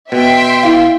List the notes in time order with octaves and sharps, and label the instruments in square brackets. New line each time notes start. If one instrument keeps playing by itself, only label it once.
[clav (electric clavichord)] B2 [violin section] E5 G5 C6
[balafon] E4 F5